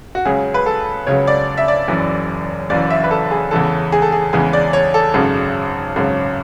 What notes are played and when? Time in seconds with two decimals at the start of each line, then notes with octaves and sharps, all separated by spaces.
0.15 F#4
0.25 C#2 C#3 F#3 G#4
0.54 B4
0.66 A4
1.06 C#2 C#3 F#3 C#5
1.27 D5
1.58 E5
1.68 D5
1.88 F#1 F#2 E3
2.70 F#1 F#2 E3 D5
2.90 E5
3.04 B4
3.11 A4
3.31 G#4
3.51 E2 C#3 E3 G#3 A4
3.92 G#4
4.02 A4
4.12 G#4
4.33 E2 C#3 E3 G#3 G#4
4.53 D5
4.73 C#5
4.94 A4
5.14 G#1 F#2 C#3 G#3
5.96 G#1 F#2 C#3 G#3